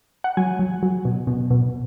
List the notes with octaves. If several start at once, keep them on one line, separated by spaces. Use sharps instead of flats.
F#5
F#3 G#5
F#3
F#3
B2
B2
B2